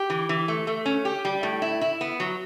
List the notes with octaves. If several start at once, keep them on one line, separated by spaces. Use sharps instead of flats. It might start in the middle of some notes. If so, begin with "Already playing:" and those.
Already playing: G4
E3
E3
A3
A3
C#4
G4
G3
A2
E4
E4
B3
F#3